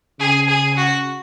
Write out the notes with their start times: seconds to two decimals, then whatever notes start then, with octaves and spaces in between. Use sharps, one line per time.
0.20 C#3 G#4
0.48 G#4
0.77 F#4